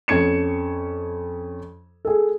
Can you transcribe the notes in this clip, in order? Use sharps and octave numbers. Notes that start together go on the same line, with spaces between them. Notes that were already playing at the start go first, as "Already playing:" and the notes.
F2 C#4 G#6 C#7 E7
G#4 A4